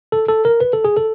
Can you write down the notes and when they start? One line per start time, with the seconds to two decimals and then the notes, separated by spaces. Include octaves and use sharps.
0.12 A4
0.28 A4
0.45 A#4
0.60 B4
0.73 A4
0.84 G#4
0.97 A4